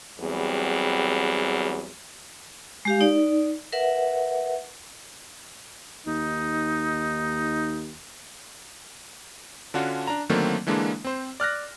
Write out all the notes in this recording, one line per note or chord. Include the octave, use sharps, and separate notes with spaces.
E2 F#3 G3 C4 G#4
G#3 G4 F5
D#4 D5
A#4 B4 E5 F#5
D#2 D#4
D3 C#4 D4 F4 F#4
D4 A#5
D3 D#3 F#3 A3 A#3 C4
D3 E3 G#3 A#3 D4
C4 C5
D5 F6 F#6 A#6